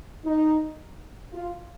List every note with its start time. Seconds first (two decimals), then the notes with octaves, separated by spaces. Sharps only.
0.25 D#4
1.34 F4